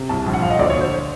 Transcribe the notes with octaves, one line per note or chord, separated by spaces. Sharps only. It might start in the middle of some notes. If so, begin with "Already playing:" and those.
Already playing: C3
C2 A5
A#1
F#5
A#1 F5
D#5
D2 D5
C#5
D2
C5